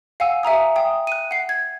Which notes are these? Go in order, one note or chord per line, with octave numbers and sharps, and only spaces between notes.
F5 F#5 G#5 E6
E5 G#5 A#5 D#6
G5 D#6
F#6 D#7
F#5 C7
G#6